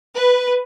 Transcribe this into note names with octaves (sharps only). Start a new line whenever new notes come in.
B4